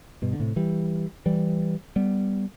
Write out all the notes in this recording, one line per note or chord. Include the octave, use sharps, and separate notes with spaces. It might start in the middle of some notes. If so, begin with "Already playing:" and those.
G2 B2
D3
A2 C3
E3 G3
E3 G3
G3 B3